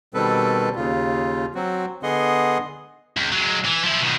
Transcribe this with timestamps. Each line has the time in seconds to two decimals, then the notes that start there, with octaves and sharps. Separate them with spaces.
0.14 B2 D#3 G3 C4 A4 B4
0.76 D#2 C#3 F4
1.55 F#3 C4 F#4
2.03 D3 B3 G#4 D#5 F#5 C6
3.17 C#2
3.32 F#3 G#3
3.65 E3
3.84 F3 E4
4.00 B2 D#3